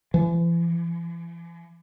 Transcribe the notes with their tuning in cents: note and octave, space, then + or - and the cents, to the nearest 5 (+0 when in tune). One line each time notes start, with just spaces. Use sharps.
E3 +45